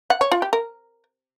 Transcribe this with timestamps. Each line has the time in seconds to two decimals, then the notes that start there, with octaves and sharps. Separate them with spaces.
0.10 F#5
0.21 C#5
0.32 F4
0.42 G4
0.53 A#4